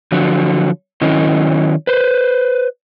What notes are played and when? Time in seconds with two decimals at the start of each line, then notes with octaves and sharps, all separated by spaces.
0.12 D3 F3 F#3 F#4
1.01 D#3 F#3 C#4 E4 D#5
1.87 B4 C5